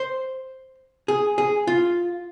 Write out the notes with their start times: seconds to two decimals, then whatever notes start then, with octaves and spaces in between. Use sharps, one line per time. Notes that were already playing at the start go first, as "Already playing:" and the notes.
Already playing: C5
1.08 G#4
1.38 G#4
1.67 F4